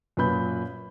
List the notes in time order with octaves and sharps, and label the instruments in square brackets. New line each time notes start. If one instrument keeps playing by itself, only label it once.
[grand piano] F#2 A#2 B4 B5 G6